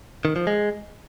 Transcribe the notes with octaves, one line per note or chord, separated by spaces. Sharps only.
D#3
F3
G#3